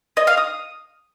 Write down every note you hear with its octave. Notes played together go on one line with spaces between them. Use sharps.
D#5
F5
D#6